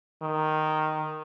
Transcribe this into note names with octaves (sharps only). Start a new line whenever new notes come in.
D#3